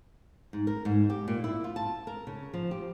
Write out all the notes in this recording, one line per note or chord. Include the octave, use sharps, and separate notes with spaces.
G#2
A#4
G#2
G4
A#2
E4
F4
A5
A#4
C#3
F3
G4